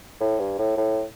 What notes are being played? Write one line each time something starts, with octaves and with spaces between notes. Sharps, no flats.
A2
G2
A2
A2